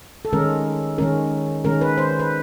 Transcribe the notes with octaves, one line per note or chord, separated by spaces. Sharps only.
A4
D#3 G#3 C#4 A#4
D#3 G#3 C#4 A#4
D#3 G#3 C#4 A#4
B4
C5
B4